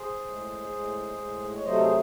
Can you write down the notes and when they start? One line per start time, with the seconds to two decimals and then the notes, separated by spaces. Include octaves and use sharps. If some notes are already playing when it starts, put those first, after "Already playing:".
Already playing: G#4 C5
0.25 A2 G#3
0.72 A2 G#3
1.18 A2 G#3
1.55 C#5
1.65 C3 F#3 A3 C5 D#5
1.73 A4
1.80 G#4 C5